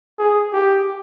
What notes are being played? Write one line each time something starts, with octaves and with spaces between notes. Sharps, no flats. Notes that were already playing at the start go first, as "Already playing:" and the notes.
G#4
G4